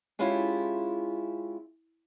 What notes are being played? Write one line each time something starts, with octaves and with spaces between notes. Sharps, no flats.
G#3 C#4 E4 F4 G4